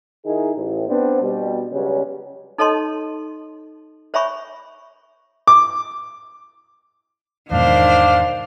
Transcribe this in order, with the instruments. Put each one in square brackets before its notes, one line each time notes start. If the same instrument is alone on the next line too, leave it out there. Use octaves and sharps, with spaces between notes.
[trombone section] D#3 D#4 E4 G#4
A1
B3 C4 D4
B2 G3
C#2 C#3 F#3 G3 C#4 B4
[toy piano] D#4 A4 C#5 D#5 A5 C6
C5 C#5 E5 G#5 B5 C#6
[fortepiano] D6
[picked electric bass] E2 G#2 B2 [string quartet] D#3 C5 [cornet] D4 [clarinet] F5